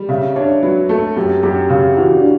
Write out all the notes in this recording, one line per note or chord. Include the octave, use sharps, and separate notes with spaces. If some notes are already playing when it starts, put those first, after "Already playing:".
Already playing: G3
C#3 E5
D4 C#5
F#3 B4
A3 A4
F#2 G4
F#2 G4
C#3 G4
E3 F#4
D4